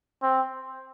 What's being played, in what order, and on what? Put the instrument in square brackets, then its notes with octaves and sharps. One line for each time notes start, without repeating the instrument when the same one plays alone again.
[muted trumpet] C4